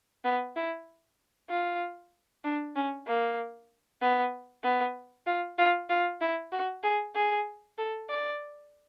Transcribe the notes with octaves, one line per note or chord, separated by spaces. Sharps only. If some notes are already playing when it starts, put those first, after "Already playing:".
B3
E4
F4
D4
C#4
A#3
B3
B3
F4
F4
F4
E4
F#4
G#4
G#4
A4
D5